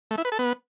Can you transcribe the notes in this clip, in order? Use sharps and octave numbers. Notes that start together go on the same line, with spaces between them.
A3
E4
B4
A4
B3